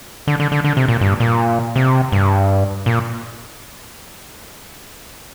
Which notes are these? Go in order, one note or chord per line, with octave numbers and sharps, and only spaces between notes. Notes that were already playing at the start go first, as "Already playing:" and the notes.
D3
D3
D3
D3
C3
A#2
G2
A#2
C3
G2
A#2